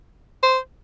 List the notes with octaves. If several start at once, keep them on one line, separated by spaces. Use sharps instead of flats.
C5